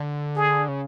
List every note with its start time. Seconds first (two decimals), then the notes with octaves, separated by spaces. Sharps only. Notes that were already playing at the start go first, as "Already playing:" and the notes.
Already playing: D3
0.36 G#4
0.68 C#3